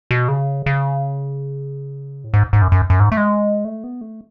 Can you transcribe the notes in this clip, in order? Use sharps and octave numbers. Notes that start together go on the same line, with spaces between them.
B2
C#3
C#3
A2
G#2
G#2
F#2
F#2
F#2
G#2
A3
G#3
A3
B3
A3